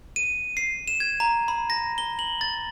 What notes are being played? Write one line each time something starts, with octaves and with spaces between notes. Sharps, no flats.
D#7
C7
E7
G#6
A#5
B5
A#6
G7
F#7
A6